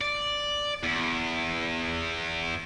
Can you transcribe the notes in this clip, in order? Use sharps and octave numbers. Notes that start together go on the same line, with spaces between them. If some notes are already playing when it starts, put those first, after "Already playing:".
D5
E2